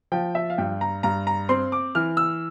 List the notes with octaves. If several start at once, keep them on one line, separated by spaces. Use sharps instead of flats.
F3 G5
E5
F5
G2 G5
A#5
G2 A#5
A#5
C4 C6
D6
E3 F6
E6